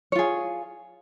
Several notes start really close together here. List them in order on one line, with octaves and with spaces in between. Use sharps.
C#5 F4 G#4